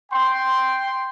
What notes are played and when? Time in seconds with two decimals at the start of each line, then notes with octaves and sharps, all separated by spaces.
0.12 G5 C6